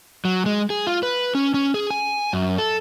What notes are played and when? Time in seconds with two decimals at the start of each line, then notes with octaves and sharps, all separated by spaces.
0.25 F#3
0.46 G#3
0.70 G#4
0.87 F4
1.03 B4
1.35 C#4
1.54 C#4
1.74 G#4
1.90 G#5
2.33 F#2
2.58 A4